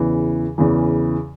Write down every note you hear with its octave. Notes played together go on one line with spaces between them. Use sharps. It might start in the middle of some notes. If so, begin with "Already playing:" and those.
Already playing: E2 C#3 E3
E2 C#3 E3